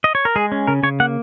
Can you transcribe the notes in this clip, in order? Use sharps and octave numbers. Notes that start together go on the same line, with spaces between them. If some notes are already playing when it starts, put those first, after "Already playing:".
D#5
C#5
A#4
G#3 G#4
C#4
C#3 A#4
C#3 C#5
A#3 F#5